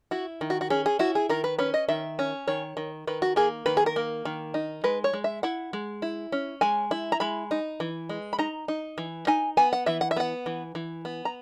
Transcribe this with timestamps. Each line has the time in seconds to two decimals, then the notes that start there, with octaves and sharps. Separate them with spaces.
0.11 E4 F#4
0.41 D#3
0.50 F#4
0.61 F#4
0.70 C#4 G#4
0.86 G#4
0.99 E4 F#4
1.15 G#4
1.29 D#3 A#4
1.44 B4
1.59 C#4 B4
1.74 D#5
1.89 D#3 E5
2.19 C#4
2.48 D#3 C#5
2.77 D#3
3.07 D#3 B4
3.22 F#4
3.36 A#3 G#4
3.66 D#3 B4
3.77 G#4
3.86 A#4
3.96 A#3
4.25 D#3
4.54 D#4
4.84 G#3 B4
5.04 C#5
5.13 G#3
5.24 E5
5.43 E4 F#5
5.73 G#3
6.02 E4
6.32 C#4
6.61 G#3 G#5
6.91 E4
7.12 A#5
7.20 G#3 B5
7.51 D#4
7.80 E3
8.09 G#3
8.33 B5
8.39 D#4 A#5
8.68 D#4
8.98 E3
9.27 D#4 G#5
9.57 B3 G#5
9.73 F#5
9.86 E3 E5
10.01 F#5
10.11 E5
10.16 B3 F#5
10.46 E3
10.75 E3
11.05 B3
11.25 A#5